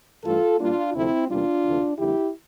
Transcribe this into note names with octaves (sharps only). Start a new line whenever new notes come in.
G2 E3 A3 F4 A4
A#2 G3 A#3 D4 F4
D2 C3 F3 A3 C4 E4
E2 C3 G3 A#3 D4 F4
D2 C3 E3 A3
F2 D3 G3 A#3 E4 G4